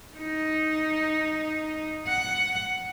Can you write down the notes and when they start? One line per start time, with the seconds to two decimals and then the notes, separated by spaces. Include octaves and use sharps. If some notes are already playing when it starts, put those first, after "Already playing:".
0.17 D#4
2.07 F#5